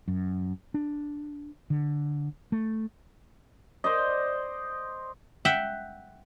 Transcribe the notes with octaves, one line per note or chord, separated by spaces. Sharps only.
F#2
D4
D3
A3
C5 D5 D#5
E5 F#5 G5